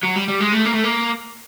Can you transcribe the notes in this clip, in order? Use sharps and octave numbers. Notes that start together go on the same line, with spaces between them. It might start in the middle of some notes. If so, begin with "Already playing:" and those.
F#3
G3
G3
G#3
A3
A#3
A3
A#3